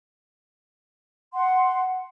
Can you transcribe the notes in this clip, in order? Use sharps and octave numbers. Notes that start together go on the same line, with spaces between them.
F#5 C6